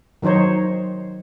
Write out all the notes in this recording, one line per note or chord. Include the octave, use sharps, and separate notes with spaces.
D#3 F#3 D#4 C5 C#5